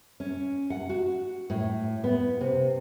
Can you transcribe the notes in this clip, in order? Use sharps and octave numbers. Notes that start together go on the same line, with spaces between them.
C#4
F#5
F#4
A2
B3
C3